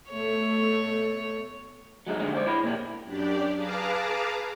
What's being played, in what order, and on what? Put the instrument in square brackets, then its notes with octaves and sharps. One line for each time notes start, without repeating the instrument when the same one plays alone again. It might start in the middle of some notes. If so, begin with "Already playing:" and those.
[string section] B2 A3 [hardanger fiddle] C#5
[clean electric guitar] F#3 G#3 D#4
G2 D3 G3 G#3 D#4
C5 D5
E4 C#5 B5
A#2 G3
[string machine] F#2 D4 G4 D5
G#4 B4 F5 A5 A#5 D6